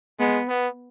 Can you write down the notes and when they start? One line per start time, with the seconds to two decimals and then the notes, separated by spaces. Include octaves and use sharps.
0.19 G#3 B3
0.48 B3